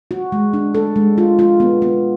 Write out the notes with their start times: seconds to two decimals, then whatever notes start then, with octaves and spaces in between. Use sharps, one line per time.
0.11 F#4
0.32 G#3
0.53 D4
0.75 A4
0.96 G#3
1.18 F4
1.39 F4
1.60 B3
1.82 B3